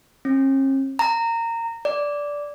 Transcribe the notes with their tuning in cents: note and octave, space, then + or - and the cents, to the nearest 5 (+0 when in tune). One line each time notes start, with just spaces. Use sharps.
C#4 -45
A#5 -20
D5 -10